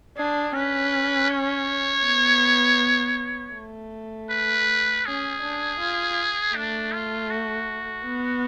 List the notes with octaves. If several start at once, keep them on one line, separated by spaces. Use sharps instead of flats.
D4 G#4
C#4 B4
C#5
B3
A3
B4
C#4 G#4
D4
F4
A3 D4
F4
F#4
B3